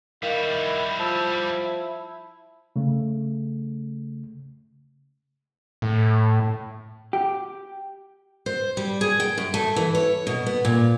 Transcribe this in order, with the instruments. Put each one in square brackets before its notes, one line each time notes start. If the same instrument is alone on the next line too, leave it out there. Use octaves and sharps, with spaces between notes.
[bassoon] D#3 [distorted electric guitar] G3 F#4 [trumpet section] E4 [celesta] F5
[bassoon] F3 [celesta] A5 E6
[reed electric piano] C#3 A3
[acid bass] A2
[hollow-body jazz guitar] G4
[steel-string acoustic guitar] C5
G3
G#4
G5
F#2
A3
E3
C#5
B2
B3
A#2